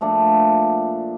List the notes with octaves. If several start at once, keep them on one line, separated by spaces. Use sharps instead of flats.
A#2 F3 A3 D4